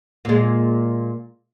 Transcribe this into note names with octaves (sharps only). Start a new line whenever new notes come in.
A#2 G#3